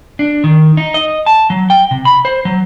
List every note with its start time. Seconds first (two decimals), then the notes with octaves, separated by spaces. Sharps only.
0.19 D4
0.44 D#3
0.77 D#4
0.94 D#5
1.26 A5
1.50 F#3
1.70 G5
1.91 C3
2.05 B5
2.25 C5
2.45 F#3